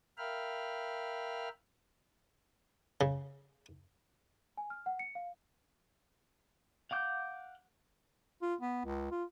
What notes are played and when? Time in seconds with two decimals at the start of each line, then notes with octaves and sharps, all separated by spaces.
0.18 A#4 E5 F5 G5 B5 F6
3.01 C#3
4.57 G#5
4.70 F6
4.86 F#5
4.99 C#7
5.15 F5
6.91 F5 F#5 D6 G6
8.42 F4
8.61 B3
8.85 C#2
9.11 F4